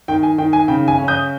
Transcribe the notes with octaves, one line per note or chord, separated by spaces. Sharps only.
D#3 G5
G#5
D#3 G5
G#5
C#3 G5
G#5
C#4
D#6 G6